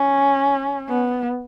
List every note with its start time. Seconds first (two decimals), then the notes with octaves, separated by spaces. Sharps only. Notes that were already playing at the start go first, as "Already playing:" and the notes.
Already playing: C#4
0.89 B3